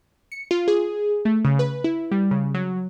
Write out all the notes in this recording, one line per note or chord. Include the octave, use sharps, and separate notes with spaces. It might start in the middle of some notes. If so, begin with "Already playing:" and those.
C#7
F4
G#4
A3
C#3
B4
E4
G3
C#3
F#3